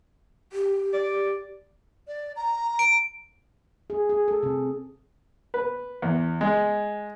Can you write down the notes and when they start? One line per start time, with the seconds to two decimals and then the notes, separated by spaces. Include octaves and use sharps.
0.53 G4
0.93 D5
2.08 D5
2.36 A#5
2.79 D7
3.90 G#4
4.09 G#4
4.28 A4
4.43 C3
5.54 B4
6.02 E2
6.41 G#3